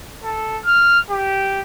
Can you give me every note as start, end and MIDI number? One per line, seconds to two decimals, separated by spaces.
0.24 0.60 69
0.65 1.00 89
1.11 1.61 67